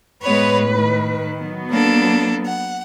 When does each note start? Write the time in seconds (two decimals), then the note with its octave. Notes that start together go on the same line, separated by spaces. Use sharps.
0.23 A2 G#3 B3 B4 C#5
0.72 D#3
1.37 F#3 B3
1.71 A#3 D4 A4
2.45 F#5